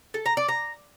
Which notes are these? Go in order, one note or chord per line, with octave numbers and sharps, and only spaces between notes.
A4
A#5
D5
A#5